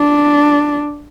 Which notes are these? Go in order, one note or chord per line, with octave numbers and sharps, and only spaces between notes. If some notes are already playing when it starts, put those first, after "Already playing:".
Already playing: D4